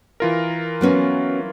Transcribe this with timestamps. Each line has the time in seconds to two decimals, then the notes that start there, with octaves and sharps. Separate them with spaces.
0.20 E3 F4 A#4
0.81 F#3 B3 C#4